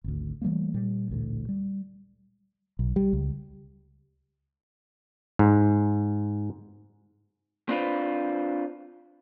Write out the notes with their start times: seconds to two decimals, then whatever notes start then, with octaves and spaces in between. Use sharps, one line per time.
0.04 G#1 D2
0.42 E3 G3 A3 A#3
0.74 A#2 G3
1.09 A1 D2 A#2
1.49 G3
2.79 B1
2.96 G3
3.13 C#2
5.39 G#2
7.69 C4 D4 F4 B4 C5